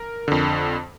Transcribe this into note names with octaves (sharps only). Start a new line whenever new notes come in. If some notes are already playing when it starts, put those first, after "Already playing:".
Already playing: A#4
F2 D3